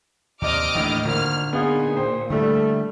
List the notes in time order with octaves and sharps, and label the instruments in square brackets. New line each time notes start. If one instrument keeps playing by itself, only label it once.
[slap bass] D#2 [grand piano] C3 C4 D5 [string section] D#5 D6 F6
[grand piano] D#2 A2 [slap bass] E3 D4
[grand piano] G#1 [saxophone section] A#2 [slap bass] D3 [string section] F6
[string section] A#2 [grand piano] B3 F4 [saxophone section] D#4 G#4
[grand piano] C5 G5
[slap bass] D3 [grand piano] G3 E4 [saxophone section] A3